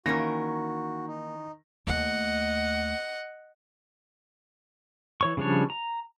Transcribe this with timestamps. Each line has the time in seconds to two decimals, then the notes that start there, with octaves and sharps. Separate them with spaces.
0.06 D#3 E3 A#3 C#4 F#4 A#4 A#6
1.08 D#4
1.87 D#2 A3 D#5 F#5
5.21 E3 C#5 C#6
5.37 C#3 F3 G3 D4 C#5
5.70 A#5